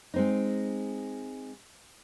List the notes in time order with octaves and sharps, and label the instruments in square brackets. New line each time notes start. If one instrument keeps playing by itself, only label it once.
[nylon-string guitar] G#3 C4 D#4